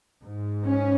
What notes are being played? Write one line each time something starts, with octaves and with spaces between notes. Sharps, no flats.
G#2
C#4